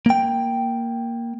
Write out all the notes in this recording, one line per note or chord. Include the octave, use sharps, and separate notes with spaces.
A#3 G5